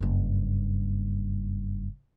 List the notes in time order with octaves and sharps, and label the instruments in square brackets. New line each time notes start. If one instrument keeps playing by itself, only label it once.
[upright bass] F#1 G2